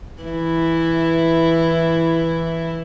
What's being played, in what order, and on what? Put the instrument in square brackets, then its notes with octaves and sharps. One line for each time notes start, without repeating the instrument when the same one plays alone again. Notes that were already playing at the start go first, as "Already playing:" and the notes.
[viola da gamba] E3 E4